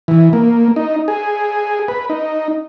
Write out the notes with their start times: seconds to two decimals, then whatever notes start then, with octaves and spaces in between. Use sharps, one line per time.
0.08 E3
0.33 A#3
0.76 D#4
1.08 G#4
1.88 B4
2.10 D#4